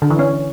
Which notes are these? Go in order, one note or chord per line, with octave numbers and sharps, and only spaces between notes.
D3
E3
C#4